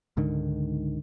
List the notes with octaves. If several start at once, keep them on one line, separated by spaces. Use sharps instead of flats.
C#2 G#2 D3 D#3